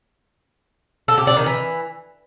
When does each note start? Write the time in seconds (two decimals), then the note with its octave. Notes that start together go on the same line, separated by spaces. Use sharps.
1.08 A4
1.18 G4
1.27 D4
1.37 D#3
1.46 E3